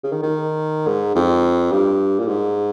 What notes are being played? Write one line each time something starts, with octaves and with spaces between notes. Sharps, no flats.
C#3
D#3
D#3
G#2
F2
G2
A#2
G#2